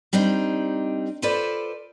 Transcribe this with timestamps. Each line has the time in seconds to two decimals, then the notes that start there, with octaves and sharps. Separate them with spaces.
0.13 G3 C4 D4 D#4
1.22 F4 A4 B4 C5 D5